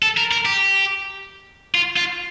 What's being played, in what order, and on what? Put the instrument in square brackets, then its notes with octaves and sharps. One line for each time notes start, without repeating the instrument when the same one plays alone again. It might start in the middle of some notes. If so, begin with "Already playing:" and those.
[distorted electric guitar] A4
A#4
A#4
G4
F4
F4